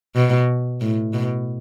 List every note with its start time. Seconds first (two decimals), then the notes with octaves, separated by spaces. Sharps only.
0.16 B2
0.81 A2
1.14 B2